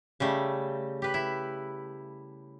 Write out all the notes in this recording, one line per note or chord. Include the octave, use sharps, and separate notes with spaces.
C#3 G3 A3
G4 B4
E4